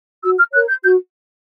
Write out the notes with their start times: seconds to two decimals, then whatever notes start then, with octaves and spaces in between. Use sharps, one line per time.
0.24 F#4 E6
0.39 F6
0.53 A#4 C#5 F#6
0.69 G6
0.83 F#4 G6